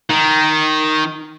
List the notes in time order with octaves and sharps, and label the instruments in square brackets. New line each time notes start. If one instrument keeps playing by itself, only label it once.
[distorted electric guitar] D#3